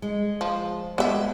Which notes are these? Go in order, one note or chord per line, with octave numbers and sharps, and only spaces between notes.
G#3
F3
G#3 B3 G4 E5